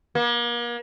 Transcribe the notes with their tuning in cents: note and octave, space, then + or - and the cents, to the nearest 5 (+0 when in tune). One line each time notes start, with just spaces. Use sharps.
A#3 +40